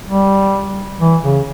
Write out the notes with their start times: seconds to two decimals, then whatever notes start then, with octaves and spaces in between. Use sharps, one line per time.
0.07 G3
1.00 E3
1.23 C#3